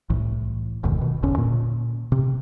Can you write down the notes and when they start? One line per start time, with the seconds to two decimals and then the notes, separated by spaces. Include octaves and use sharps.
0.10 C2 A2 E3
0.83 F1 D2 B2 D#3
0.98 B2 D#3
1.23 G1 E2 D3 C#4
1.38 A#2
2.12 C3